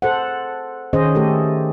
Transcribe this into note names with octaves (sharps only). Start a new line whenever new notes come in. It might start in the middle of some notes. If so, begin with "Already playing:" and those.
A4 C5 F#5
D#3 C#4 G#4 C5 D#5
A3 G4 A4